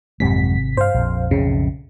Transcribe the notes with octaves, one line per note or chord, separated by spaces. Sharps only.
G#1 F2 C3 F#3 G#3 B6
G2 C5 F5
A#1 F2
B1 F2 A2 C#3